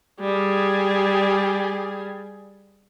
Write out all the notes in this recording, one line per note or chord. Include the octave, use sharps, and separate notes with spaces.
G3 G#4